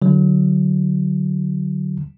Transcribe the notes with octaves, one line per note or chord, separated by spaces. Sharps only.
D3 F#3